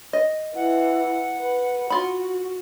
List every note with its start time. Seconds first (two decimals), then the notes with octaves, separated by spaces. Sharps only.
0.13 D#5
0.55 E3 F#5
1.39 B4
1.90 F4 F#4 B5